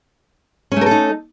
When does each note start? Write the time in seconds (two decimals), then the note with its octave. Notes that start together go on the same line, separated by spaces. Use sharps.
0.72 C#4
0.76 A3
0.81 A#4
0.86 A4
0.91 D#4